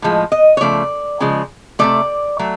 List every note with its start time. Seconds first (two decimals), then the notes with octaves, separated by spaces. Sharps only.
0.02 A2 F3 G#3
0.32 D#5
0.57 C#5
0.61 C#3 F3 A3 D5
1.20 C#3 F3 G#3
1.79 C3 F3 A3 D5
2.39 F#3 A3